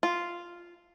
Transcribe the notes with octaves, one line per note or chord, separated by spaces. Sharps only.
F4